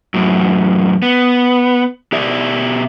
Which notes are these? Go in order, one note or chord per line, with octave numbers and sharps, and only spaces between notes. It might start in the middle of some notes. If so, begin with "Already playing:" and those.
F#2 A2
B3
B2 G4 D5 E5